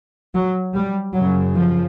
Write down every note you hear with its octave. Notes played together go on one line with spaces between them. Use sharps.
F#3
G3
F#2 C#3 F#3
F3